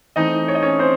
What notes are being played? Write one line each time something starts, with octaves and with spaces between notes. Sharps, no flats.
E3 A3 C4 D#4 D#5
C#5
D#5
C#4 C#5
C4 C5